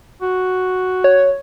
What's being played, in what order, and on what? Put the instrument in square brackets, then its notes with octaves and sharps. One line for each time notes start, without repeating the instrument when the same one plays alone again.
[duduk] F#4
[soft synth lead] C#5